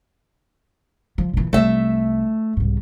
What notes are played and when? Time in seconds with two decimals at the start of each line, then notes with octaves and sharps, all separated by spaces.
1.18 F3
1.33 A#2 E3
1.53 C2 A3 E5
2.57 C2 G#2